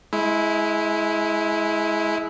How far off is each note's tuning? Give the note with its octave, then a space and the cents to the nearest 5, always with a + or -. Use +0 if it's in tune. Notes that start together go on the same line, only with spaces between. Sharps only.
G#3 +25 E4 -5